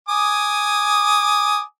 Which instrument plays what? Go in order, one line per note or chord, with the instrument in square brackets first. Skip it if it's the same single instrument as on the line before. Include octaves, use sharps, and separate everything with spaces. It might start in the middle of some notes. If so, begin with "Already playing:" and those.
[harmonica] G#5 D6 D#6